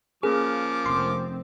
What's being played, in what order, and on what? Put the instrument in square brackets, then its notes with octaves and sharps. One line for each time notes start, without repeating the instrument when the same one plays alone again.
[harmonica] F3 D6 [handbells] A#3 C#4 A#4 [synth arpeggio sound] G#4
[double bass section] F1 C4 [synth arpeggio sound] C6